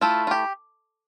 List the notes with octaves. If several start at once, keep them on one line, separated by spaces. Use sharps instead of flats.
A3 E4 F4
F4
G4